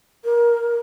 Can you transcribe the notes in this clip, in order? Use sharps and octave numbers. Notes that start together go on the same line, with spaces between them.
A#4